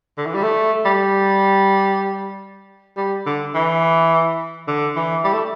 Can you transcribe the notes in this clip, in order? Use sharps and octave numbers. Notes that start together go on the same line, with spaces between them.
D3
E3
G3
A3
G3
G3
D3
E3
D3
E3
G3
A3